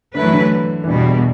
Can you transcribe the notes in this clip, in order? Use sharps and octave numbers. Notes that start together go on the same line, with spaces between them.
D3 F#3 A3 E4 B4
E3
D3
E3
E2 B2 D3 G3